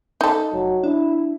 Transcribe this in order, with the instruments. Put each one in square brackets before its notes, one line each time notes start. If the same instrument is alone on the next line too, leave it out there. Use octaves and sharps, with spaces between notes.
[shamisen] D#4 A4
[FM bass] F1 [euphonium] F#3
[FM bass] D4 [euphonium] E4